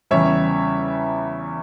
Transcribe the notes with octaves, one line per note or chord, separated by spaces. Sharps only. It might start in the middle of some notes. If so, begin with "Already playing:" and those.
E2 C#3 G3 C#5 E5